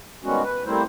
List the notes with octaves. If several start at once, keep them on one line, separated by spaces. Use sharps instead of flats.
D#3 G3 G#3 B3 C#4 F#4
B4
G3 A3 A#3 C4 E4 C5